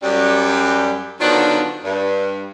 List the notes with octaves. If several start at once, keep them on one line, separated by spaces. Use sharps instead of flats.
F#2 G3
D3 D#3 F3 F#3 B3 D4
G2